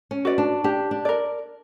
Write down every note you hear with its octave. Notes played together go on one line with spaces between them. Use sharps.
C#4
F#4 B4 D5
D4
D4 G4
D4
A#4 D5